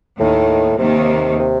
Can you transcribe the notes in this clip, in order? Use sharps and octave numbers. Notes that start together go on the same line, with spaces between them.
D#2 A2 D#3
D#2 C3 D#3
C3